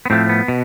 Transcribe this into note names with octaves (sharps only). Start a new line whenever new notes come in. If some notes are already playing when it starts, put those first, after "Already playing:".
B3
A2 F3 A3 C4
B3
B2